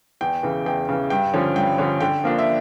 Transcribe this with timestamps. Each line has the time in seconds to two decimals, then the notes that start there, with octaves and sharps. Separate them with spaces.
0.21 E2 G5
0.43 C#3 E3
0.66 E2 G5
0.89 C#3 E3
1.10 G2 G5
1.33 D3 F3 C#4
1.56 G2 G5
1.78 D3 F3 C#4
2.01 D3 G5
2.24 F3 A#3 D4
2.39 E5